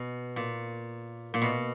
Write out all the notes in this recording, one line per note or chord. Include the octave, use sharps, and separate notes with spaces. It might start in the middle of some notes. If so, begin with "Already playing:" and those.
Already playing: B2
A#2
A#2
B2